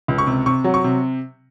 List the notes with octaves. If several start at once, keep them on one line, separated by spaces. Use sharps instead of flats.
C#2
C#6
C3
C3 C#6
F#3
C#6
C3